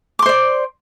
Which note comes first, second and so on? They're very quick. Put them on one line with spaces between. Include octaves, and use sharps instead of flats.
D6 C6 C5 D5